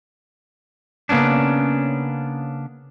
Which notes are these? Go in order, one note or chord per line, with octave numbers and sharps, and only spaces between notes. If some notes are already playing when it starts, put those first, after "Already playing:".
C#3 A#3 B3 C#4 D4